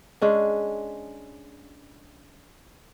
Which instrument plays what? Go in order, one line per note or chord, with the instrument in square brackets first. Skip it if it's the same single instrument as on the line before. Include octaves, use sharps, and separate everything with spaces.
[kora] G#3 C#4 D4